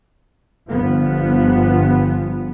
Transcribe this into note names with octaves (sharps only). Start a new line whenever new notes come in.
G1 F3 B3